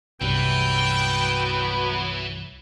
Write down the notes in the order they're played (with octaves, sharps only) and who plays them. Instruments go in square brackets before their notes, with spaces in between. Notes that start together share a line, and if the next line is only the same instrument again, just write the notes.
[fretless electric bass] C2 G2 G3 [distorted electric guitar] E3 [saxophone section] F#3 B3 [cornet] G5